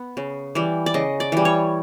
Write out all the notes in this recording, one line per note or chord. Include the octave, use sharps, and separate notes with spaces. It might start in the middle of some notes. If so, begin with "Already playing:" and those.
Already playing: B3
C#3
E3 G3
D5
C#3 D#5
D5
E3 G3
C#5